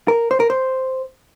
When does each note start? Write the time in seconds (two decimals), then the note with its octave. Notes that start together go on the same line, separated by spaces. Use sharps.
0.08 A#4
0.31 C5
0.40 A#4
0.50 C5